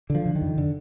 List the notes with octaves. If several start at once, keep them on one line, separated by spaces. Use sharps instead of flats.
D3
F3
D3
D#3
F2
D3